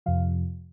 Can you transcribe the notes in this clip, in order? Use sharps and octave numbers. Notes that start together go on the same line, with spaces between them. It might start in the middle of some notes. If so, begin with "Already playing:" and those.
F2 C3 F3 F5